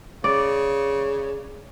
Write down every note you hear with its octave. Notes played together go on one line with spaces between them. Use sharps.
C#3 D5